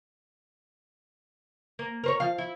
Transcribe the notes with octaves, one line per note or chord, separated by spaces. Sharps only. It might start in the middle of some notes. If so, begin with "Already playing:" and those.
A#3
A#4 C5 C#5
F3 F5
E4